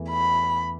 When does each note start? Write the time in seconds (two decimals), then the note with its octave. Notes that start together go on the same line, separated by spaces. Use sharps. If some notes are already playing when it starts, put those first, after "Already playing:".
Already playing: E2 E3 A3
0.10 B5